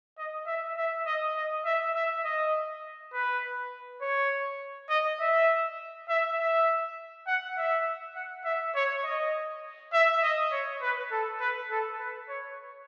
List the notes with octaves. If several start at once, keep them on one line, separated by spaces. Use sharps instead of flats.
D#5
E5
E5
D#5
D#5
E5
E5
D#5
B4
C#5
D#5
E5
E5
E5
F#5
E5
F#5
E5
C#5
D#5
E5
D#5
C#5
B4
A4
B4
A4
B4
C#5